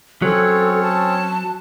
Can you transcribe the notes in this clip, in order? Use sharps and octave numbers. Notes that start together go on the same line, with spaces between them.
F#3 C4 C#4 A4 C#5
A5